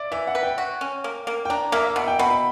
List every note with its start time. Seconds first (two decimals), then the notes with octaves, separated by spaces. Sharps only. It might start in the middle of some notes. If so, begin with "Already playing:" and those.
Already playing: D5 E5
0.12 E3 E5
0.27 F#5
0.35 B4
0.43 G5
0.58 F#4
0.81 C#4
1.04 A#3
1.27 A#3
1.45 G5
1.50 D4 A#5
1.72 A#3 E5
1.87 E5
1.96 B2 F#5
2.08 G5
2.19 B2 B5
2.30 B5